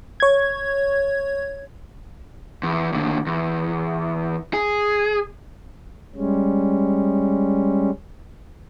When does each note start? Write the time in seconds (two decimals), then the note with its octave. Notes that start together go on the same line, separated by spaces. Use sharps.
0.20 C#5 G#6
2.63 E2
2.92 D#2 D3
3.27 E2
4.53 G#4
6.15 G3 G#3 C#4